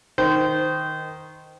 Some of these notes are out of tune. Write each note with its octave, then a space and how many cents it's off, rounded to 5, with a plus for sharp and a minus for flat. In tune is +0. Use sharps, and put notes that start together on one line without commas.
D#3 +0 C5 -20